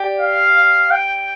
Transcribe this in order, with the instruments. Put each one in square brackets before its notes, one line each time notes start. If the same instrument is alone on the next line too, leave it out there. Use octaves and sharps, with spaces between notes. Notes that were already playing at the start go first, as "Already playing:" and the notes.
Already playing: [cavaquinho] G4 D5
[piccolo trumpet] F5
G5